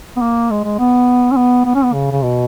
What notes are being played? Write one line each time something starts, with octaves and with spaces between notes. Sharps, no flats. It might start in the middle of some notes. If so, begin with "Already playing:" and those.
B3
A#3
G#3
G#3
B3
C#4
B3
B3
C#4
B3
C#3
C#3
B2